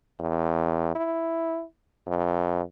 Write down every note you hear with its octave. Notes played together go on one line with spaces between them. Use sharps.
E2
E4
F2